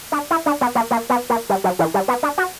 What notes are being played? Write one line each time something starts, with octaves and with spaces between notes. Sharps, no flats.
D4
E4
D4
B3
A#3
A#3
B3
A#3
G3
F#3
E3
G3
B3
D4
F#4